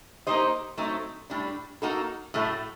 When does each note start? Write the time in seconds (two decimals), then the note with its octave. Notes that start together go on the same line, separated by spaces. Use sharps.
0.27 A#3 D#4 G4 C5 D#5
0.77 F#3 A3 C4 D#4
1.30 A2 G3 D4
1.82 A#3 D#4 F#4 A4
2.34 A2 F#3 A3